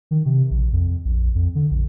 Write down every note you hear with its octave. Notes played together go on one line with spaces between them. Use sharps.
D#3
C3
A#1
F2
A#1
F2
D3
A#1